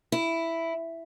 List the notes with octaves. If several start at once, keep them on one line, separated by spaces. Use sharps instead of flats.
E4